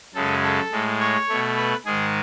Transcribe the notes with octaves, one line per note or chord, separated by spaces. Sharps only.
F#2 C#3 G#3 A4
A4
A2 G#3
C#5
B2 A3
B4
G#2 D#3 G#3 G#4